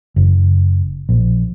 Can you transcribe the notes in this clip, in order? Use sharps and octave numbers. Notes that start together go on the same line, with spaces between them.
F#1
A#1